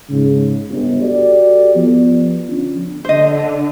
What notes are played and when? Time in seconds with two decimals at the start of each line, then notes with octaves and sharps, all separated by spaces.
0.10 G#2 C#3
0.70 G1
1.01 F#4 G4 A4 D5
1.76 F3 B3
2.49 D3 F3 C#4
3.05 D3 C5 D#5